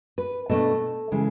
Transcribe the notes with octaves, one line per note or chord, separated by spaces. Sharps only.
B4
B2 A3 D4 A4
C#3 E3 G#3